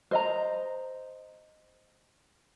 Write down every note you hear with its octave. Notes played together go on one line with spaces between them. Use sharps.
C5 D#5 A#5